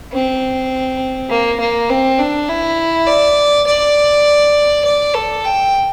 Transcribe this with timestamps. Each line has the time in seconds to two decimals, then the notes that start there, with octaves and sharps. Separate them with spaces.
0.12 C4
1.30 A#3
1.60 A#3
1.90 C4
2.19 D4
2.49 E4
3.07 D5
3.67 D5
4.85 D5
5.14 A4
5.45 G5